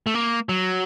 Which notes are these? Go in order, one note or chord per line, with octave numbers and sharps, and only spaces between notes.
A3
A#3
F#3